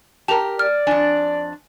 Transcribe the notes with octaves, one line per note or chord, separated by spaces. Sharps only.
G4 A#4 A5 F7
D5 F6
F2 D4 G#5